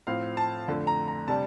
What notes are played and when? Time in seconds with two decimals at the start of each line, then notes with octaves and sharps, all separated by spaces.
0.07 A2 F3 C4 F5
0.37 A5
0.68 F2 D3 A3
0.87 A#5
1.08 A#5
1.28 C3 G3 D4 A5